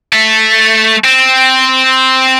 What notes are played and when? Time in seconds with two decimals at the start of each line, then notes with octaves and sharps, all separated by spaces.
0.13 A3
1.04 C4